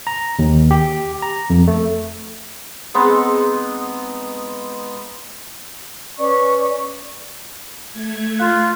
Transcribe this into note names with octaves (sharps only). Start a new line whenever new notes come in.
A#5
D#2
G4
A#5
F2
A3
G#3 B3 C4 D#4
C#4 B4 D5 C#6
A3 G#6
F4 F5 F#6